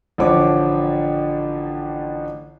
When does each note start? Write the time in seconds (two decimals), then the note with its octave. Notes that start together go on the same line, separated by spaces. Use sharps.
0.18 A1 D3 F3 C#5 D6